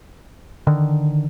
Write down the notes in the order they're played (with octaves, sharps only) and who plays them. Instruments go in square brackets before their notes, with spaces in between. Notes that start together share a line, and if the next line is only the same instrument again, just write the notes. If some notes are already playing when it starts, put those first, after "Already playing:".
[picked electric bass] D3 D#3